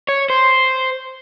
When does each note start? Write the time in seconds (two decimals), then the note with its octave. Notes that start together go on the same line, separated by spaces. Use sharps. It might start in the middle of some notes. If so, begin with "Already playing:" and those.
0.08 C#5
0.30 C5